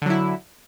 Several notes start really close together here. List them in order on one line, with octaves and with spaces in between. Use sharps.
D3 F#3 E4